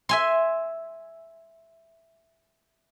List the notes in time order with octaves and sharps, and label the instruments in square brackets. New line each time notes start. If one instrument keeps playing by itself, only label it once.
[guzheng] E5 G#5 C6